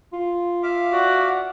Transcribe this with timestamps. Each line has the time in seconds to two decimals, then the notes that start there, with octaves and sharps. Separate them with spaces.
0.13 F4
0.63 E5 F5 D6
0.92 F#4 D5 F#5